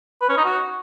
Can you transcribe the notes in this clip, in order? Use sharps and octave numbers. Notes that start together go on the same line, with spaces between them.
B4
C#4
D#4
F#4